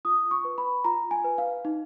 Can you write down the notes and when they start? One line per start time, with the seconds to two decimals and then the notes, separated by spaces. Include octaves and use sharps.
0.05 F4 D#6
0.31 C#6
0.45 B4
0.58 B5
0.84 F4 A#5
1.11 G#5
1.24 B4
1.38 F5
1.65 D#4